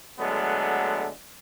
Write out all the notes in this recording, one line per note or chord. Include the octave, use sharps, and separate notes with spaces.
D3 F#3 G#3 A3 B3